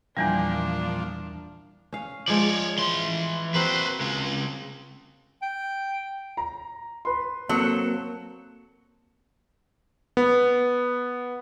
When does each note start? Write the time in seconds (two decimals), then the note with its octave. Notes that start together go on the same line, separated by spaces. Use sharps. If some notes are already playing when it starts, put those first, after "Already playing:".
0.17 E2 A#2 E3 F3 G3 D4
1.92 C#4 F5
2.28 F3 G#3 F4 C#5 D5
2.78 E3 C6
3.54 A#3 C4 F#4 B4 C5
4.01 C#3 G#3
5.42 G5
6.37 A#5
7.05 B4 C6
7.49 F#3 A#3 C4 A4
10.17 B3